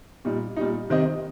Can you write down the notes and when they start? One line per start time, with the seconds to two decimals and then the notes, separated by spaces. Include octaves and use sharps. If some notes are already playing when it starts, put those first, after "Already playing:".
0.25 A#2 G3 D#4
0.57 A#2 G3 D#4
0.90 C3 D#3 C4 G4 D#5